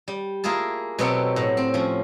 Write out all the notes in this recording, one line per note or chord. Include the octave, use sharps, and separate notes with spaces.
G3
A#3 E4 F4 G#4 A5
B2 F#3 B3 C4 G4 A4
A2
C4
F3 C#4